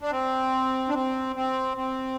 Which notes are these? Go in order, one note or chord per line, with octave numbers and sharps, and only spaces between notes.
D4
C4
D4
C4
C4
C4